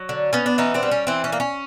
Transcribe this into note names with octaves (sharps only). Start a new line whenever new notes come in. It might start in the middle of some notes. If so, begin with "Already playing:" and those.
Already playing: F#3
D3
B3 C#4
D4
E3 C#4 D#4
C4 D4
G3
C#4
E3 C4
C#4
A#3
C#4